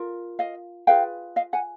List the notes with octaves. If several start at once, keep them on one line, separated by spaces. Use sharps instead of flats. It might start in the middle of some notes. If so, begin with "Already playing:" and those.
Already playing: F4 A#4
D#5 F5
F4 G#4 B4 F5 G5
D#5 F5
F#5 G#5